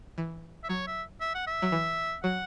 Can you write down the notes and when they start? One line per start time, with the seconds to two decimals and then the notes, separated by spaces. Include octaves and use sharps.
0.18 E3
0.64 E5
0.69 F#3 C#5
0.87 E5
1.21 E5
1.35 F#5
1.47 E5
1.62 F#3
1.72 E3
2.23 F#3 F#5